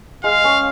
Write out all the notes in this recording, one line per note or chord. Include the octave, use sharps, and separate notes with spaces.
G#3 F5
C#4